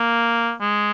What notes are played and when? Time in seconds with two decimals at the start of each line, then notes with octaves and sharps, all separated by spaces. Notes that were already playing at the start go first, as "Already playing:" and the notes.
Already playing: A#3
0.61 G#3